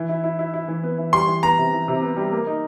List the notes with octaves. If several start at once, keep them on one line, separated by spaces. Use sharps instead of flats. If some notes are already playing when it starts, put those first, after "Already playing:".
Already playing: E3
E4
E4
E4
E4
E3
B3
E3
G3 C6
E3
B3 A#5
C3
E3
C3
B3
G3
A#3
D#4